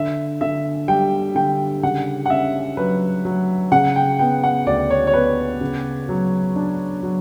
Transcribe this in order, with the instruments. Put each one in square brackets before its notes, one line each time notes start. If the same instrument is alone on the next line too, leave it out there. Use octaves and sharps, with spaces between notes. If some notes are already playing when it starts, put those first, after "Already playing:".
Already playing: [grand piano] D3 [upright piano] E5
[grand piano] D3 [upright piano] E5
[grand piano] G3 [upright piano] G5
[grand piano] D3 [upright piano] G5
[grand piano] C#3 [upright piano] F#5
[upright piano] F#5
[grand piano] C#4 [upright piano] E5
[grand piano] F#3 [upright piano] B4
[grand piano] F#3
[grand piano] C#3 [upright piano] F#5
[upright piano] G5
[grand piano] B3 [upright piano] G5
[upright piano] F#5
[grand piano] D2 [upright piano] D5
[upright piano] C#5
C#5
[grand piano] B3 [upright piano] B4
[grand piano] C#3
F#3
D4
F#3